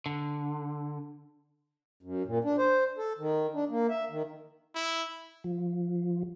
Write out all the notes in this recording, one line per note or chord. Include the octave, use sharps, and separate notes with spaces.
D3
F#2
A#2
D4
C5
A4
D#3
D4
A#3
E5
D#3
E4
F3